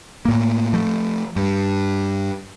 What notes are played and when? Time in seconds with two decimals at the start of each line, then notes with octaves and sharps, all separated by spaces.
0.25 A2 A#3
0.73 F3 A3
1.36 G2